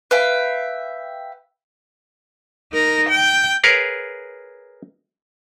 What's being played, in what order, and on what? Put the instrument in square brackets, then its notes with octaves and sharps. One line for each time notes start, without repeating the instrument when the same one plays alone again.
[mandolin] B4 E5 F5 G5
[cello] D#4 A#4
G5
[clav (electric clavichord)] G#4 A#4 B4 C#5 F5